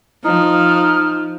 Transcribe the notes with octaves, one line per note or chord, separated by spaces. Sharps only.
F3 D#4 F6